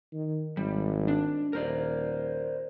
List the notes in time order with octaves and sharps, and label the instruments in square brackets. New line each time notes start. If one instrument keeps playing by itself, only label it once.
[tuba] D#3
[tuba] G#1 [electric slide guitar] G3
[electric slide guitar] D4
[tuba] D#1 [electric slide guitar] A#4 C5 D5